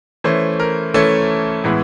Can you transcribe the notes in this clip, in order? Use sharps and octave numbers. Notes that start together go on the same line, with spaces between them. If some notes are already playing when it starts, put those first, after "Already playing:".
E3 A3 C#4 C5
A#4
E3 A3 C#4 A4
A2 E3 G#3 B3